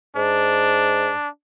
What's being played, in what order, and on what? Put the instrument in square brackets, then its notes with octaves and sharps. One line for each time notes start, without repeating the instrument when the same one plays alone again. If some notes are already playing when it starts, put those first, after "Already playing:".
[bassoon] G#2 [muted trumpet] D4